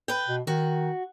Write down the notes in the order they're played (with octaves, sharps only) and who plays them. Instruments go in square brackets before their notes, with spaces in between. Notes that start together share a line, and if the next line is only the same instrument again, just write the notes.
[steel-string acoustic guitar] B4 G5
[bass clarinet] B2
[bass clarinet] D#3 [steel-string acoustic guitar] F#4